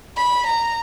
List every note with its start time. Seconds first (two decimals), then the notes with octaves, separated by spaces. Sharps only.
0.17 B5
0.47 A#5